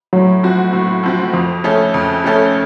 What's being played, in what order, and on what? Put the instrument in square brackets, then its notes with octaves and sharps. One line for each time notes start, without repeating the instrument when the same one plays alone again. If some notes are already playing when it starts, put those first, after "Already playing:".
[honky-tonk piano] A2 [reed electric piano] F#3
[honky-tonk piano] F3 C4 F#4
A2
F3 C4 F#4
[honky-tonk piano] F2 [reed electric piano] F3
[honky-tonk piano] C#3 A3 C#4 A4
F2
C#3 A3 C#4 A4